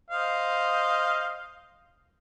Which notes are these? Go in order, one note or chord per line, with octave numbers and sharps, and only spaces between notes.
C5 D#5 F5